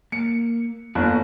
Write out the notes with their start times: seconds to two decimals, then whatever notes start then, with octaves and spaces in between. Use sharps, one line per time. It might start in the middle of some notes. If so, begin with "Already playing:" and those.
0.12 A#3 C#7
0.95 G1 A#3 D#4 E4